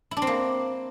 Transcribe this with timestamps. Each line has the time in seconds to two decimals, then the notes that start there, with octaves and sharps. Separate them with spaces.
0.11 E4
0.17 D4
0.22 C4
0.27 A#3